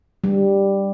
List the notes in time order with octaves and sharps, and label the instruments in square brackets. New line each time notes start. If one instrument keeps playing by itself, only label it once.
[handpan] G3